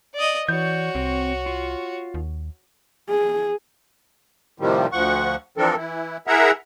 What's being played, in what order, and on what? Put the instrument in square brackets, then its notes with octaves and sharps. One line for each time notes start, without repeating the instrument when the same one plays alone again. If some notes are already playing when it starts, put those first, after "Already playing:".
[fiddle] D5 D#5
[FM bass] E3 [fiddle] F#4 C#5 [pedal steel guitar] D5 G6
[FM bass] C2 [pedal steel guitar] C4
[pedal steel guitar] F4
[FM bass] D#2
[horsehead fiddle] G#4
[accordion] A2 C3 D#3 F3 G3
D2 F3 F#5 C#6
E3 F3 C4 D4 A4 A#4
E3 E4
E4 G#4 A#4 E5 F#5 A#5